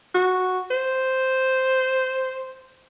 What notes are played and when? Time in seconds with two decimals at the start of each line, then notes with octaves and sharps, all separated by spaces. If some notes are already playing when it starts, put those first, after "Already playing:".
0.15 F#4
0.71 C5